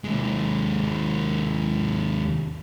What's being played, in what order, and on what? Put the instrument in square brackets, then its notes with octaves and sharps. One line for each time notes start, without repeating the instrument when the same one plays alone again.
[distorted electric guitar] D#2 G#3